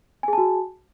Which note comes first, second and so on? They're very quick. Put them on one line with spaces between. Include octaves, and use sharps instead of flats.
G#5 G#4 A5 F#4